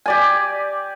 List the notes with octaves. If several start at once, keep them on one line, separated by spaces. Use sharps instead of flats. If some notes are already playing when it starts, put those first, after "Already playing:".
G4 D5 G#5